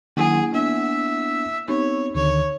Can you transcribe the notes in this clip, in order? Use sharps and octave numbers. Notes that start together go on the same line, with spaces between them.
D#3 F#3 A#3 E4 G#4 F#5
B3 D4 E5
B3 C4 D#4 C#5
D2 D3 D#3 C#5